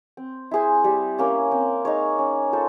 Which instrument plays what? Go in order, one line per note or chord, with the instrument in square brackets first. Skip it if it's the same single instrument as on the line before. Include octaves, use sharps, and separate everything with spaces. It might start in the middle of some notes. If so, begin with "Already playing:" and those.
[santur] C4
E4 G#4 C5
G3
A#3 C#4
C4
D#4 G#4 C#5
C#4
F4 A4 C5